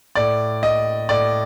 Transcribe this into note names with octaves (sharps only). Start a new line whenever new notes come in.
A2 D5
D#5
A2 D5